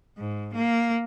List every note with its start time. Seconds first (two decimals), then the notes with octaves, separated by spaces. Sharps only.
0.17 G#2
0.55 A#3